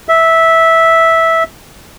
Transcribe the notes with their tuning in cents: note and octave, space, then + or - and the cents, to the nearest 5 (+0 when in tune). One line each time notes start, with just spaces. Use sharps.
E5 -10